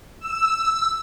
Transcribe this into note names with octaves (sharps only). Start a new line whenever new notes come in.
E6